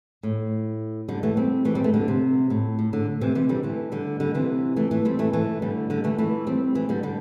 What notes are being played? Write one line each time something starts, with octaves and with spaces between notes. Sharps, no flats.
A2
D3 G3
E3 A3
G3 C4
E3 A3
G3 C4
E3 A3
D3 G3
C3
A2
A2
A2 D3
C3 E3
C3 E3
D3 G3
E3 A3
D3 G3
D3 G3
C3 E3
E3 A3
E3 A3
G3 C4
E3 A3
E3 A3
D3 G3
D3 G3
E3 A3
E3 A3
G3 C4
E3 A3
D3 G3
D3 G3